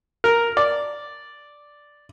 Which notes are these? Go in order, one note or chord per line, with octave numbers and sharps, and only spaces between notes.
A#4
D5